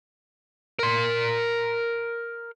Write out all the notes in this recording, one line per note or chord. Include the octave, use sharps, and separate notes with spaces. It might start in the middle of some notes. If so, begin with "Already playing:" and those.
A#4 C6